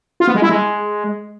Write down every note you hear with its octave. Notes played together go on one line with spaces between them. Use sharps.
F4
B3
G#3
E4
G#3